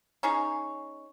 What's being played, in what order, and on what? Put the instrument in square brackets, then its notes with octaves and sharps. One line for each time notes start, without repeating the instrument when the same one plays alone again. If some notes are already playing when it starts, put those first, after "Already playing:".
[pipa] C#4 D#4 G#4 C#5